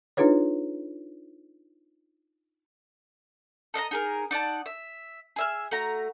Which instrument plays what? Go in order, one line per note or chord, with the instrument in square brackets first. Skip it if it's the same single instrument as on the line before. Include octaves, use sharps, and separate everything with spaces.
[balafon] D4 D#4 F4 G#4 B4 C#5
[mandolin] A4 D#5 F5 A#5
D#4 G#4 A#4
D#4 D5 F#5 A5
E5
G#4 E5 F6
A3 F#4 A#5